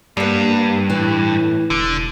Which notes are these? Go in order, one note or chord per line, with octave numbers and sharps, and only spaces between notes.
G2 G3 A#3 B3
A2 E3
E1 D3